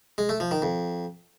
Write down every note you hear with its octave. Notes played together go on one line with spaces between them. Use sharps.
G#3
A3
F3
D#3
F2